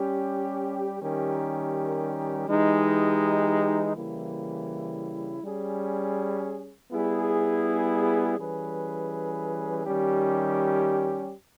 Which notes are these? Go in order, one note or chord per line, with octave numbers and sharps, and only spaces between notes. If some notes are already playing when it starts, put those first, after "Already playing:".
Already playing: G3 C#4 G4
D#3 G3 C#4 G4 A#4
E3 G#3 D#4 G4
C#3 E3 G3 A#3 E4
G3 C#4 G#4
G3 B3 E4 G#4
E3 G3 C#4 G#4 B4
D#3 G3 C#4 G4